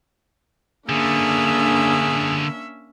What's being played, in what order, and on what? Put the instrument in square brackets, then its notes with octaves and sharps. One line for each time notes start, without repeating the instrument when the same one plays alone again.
[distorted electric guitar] D3 B3 [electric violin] A#3 D4 [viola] C#4 E5 [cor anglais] G#4